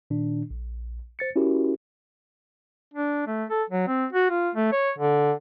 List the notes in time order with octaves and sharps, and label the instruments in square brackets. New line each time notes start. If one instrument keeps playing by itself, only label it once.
[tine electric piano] A#2 D#3 D4
A#1
C5 A6 C#7
C#4 E4 F#4 G4 A#4
[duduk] D4
A3
A4
F#3
C4
F#4
F4
A3
C#5
D3